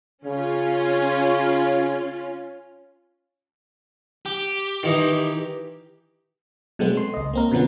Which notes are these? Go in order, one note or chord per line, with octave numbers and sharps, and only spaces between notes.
C#3 C#4 F4
G4
D#3 E3 D#4
B2 F#3 G#3 A3 B3 C4
C6
C#2 D#5
A#3 C4 A#4
B2 D3 F3 B3 C#4